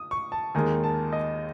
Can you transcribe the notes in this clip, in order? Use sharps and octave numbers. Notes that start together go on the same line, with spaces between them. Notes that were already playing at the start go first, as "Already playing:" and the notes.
Already playing: D#6
C#6
A5
D#2 D#3 G#3 G#5
A5
D#5